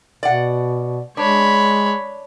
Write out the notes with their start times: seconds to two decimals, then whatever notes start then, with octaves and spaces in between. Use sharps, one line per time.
0.23 B2 D5 F#5
1.17 G#3 D4 C#5 B5